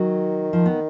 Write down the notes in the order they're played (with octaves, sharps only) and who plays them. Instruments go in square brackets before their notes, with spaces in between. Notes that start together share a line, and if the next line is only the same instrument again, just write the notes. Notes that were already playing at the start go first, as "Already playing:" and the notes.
Already playing: [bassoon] D#3 [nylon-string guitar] F#3
[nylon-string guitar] F3
B3